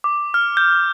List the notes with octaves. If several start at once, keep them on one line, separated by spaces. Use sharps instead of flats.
D6
F6
G6